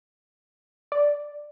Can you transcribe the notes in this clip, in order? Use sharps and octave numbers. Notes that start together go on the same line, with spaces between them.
D5